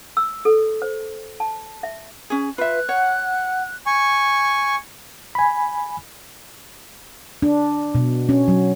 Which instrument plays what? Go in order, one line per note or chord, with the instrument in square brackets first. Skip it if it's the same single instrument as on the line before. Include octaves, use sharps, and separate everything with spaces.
[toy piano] E6
A4
C5
A5
E5
[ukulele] C#4 G#4
[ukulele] F4 E5 [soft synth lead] B4 [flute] F#6
[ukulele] C#5 [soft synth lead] F#5
[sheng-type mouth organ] G#5 C#6
[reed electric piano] G#5 B5
[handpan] D4
B2
C#4
F#3